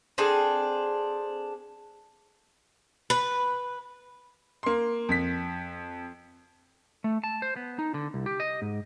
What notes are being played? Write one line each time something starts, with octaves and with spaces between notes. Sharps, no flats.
C4 D4 G#4 A4
B4
A#3 C6
F2 B6
A3
A5
C5
B3
D#4
D3
C2
G4
D#5
G#2